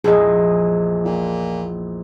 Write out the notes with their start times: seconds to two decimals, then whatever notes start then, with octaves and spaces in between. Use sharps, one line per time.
0.04 A#1 E2 G#4 D#5
1.05 A#2